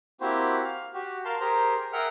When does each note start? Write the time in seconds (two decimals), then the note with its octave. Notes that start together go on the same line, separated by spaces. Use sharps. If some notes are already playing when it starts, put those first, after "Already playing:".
0.21 A#3 C4 E4 F#4 G4 C5
0.64 F5
0.94 F#4 G4
1.25 A#4 F5 A5 C6
1.41 G4 G#4 A#4 C5 A#5
1.93 G#4 A#4 E5 F#5 G5 F6